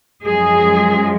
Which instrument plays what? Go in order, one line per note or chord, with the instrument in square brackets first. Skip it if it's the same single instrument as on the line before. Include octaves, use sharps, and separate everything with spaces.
[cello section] F#2 F3 G#3 G#4